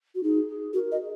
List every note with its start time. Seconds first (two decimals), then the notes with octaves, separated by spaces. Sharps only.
0.15 F#4
0.23 D#4 G#4
0.48 G#4
0.74 F#4 A#4
0.92 D#5
1.00 G#4